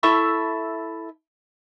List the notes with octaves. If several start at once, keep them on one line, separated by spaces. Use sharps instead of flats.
E4 A4 E5 C#6